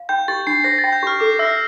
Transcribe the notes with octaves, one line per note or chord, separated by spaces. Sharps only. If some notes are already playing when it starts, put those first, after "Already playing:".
Already playing: F5
G5 G6
G4 A6
D4 C7
C5 A#6
A6
G5
G6
G4 F6
A4 D6
E5 E6